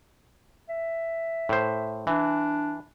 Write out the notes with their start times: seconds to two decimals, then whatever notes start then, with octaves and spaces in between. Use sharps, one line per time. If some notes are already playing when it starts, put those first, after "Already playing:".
0.69 E5
1.49 A2 C5
2.07 E3 D4